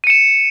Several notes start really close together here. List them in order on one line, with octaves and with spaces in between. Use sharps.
D#7 C#7 E7